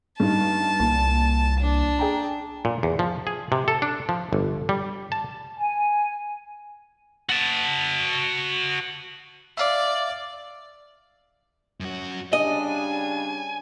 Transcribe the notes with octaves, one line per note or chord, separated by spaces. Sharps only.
G2 D#4 A5
C2 A#2
D4
G#4 G5 A#5
A#2
E2
F3
G#4
C3
A4
D4
F3
G1
G3
A5
G#5
F#4 A5
D5 E5 F5 D6
F#2 F#4
C#3 G3 D4 D#5 G#5